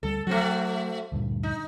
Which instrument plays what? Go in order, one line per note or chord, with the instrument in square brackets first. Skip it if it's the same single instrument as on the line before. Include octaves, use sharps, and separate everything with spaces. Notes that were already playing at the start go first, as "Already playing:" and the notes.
[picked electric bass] D2 G3 [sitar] A4
[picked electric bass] F#3 [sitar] A3 C4 F#4
[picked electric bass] D2 G2 A#2
[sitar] D#4